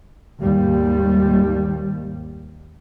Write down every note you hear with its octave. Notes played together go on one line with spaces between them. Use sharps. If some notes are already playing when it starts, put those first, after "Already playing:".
D#2 G#2 G3